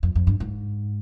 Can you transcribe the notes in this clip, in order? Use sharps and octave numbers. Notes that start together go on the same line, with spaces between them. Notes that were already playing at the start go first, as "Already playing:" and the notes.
F2
F2
G2
G#2